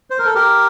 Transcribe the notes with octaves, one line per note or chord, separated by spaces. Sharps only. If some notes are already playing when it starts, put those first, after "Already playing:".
C5
A#4
A4
G4 A#4